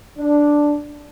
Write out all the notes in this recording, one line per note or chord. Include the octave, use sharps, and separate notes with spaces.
D4